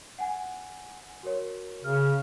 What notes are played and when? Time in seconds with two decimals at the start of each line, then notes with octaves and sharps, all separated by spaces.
0.19 F#5 G#5
1.23 F#4 A#4 C#5
1.84 C#3 F6